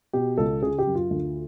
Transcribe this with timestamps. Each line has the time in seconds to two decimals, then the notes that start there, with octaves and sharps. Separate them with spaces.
0.13 B2 G4
0.37 C#2 A4
0.62 C#3 G#4
0.78 G4
0.87 F#2
0.95 F4
1.11 D2